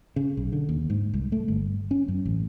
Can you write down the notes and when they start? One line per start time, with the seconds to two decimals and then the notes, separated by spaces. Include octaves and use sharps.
0.16 C#3
0.37 B1
0.52 D3
0.69 D#2
0.90 G#2
1.13 C2
1.32 A3
1.48 G1
1.91 C#4
2.08 F#2
2.25 A1